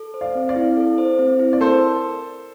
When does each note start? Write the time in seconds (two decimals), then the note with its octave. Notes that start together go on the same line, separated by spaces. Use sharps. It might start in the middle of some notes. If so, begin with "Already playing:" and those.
Already playing: A4
0.14 C5
0.21 D5 F5
0.35 C4
0.49 D5 F5
0.56 E4
0.77 A4
0.98 C5
1.19 C4
1.39 E4
1.53 D5
1.60 A4 A#4 C5